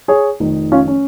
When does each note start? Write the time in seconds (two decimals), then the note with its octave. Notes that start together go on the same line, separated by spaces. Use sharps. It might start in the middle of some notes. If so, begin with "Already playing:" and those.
0.08 G#4 C#5
0.40 F1 F2 D#3
0.72 C#4 F4
0.88 C#4